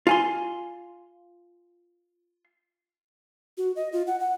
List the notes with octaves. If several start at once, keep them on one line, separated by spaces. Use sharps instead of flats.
F4 G#5 C6
F#4
D#5
F4
F#5
F#5